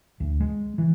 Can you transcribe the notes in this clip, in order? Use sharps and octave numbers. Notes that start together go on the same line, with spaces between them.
D2
G#3
E3